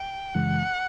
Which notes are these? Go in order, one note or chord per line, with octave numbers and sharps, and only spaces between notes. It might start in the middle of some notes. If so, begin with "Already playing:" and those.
Already playing: G5
F#2 C#3 E3 G#3 F#5